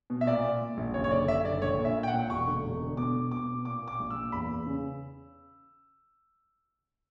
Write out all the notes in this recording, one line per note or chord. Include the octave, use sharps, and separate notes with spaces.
B2
E5
A#2 D5
A#2
A#2
A#1
F#1 C#5
C#5
D3 D5
F#1 E5
D3 D5
A#1 C#5
A#2
E5
A#2
G5
F#5
A#2
E1 C#6
D3
E1
D3
B2 D6
B2
B2 D6
B2
A#2 D6
A#2
D6
A#1
E6
A#2
E2 B5
E2
C#3